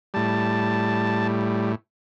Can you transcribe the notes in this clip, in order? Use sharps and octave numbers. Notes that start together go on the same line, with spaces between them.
A2 G3 A5